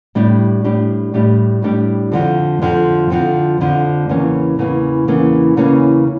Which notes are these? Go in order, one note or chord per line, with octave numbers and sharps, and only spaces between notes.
A2 G3 D4 G4
A2 G3 D4 G4
A2 G3 D4 G4
A2 G3 D4 G4
F2 D3 F3
F2 D3 F3
F2 D3 F3
F2 D3 F3
E2 C#3 E3 A#3 C#4
E2 C#3 E3 A#3 C#4
E2 C#3 E3 A#3 C#4
E2 C#3 E3 A#3 C#4